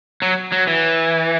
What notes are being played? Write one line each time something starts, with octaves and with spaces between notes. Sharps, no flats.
F#3
F#3
E3